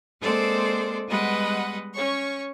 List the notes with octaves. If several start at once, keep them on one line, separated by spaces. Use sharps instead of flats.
G#3 A#3 C4 A4 C5 D5
G3 G#3 B3 B4 D#5 F#5
C#4 C#5 C#6